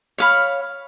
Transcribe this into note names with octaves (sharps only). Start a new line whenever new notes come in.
C#5 F5 B5